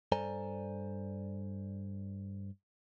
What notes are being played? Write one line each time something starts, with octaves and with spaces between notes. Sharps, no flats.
G2 A4 C5 D5 G#5 A#5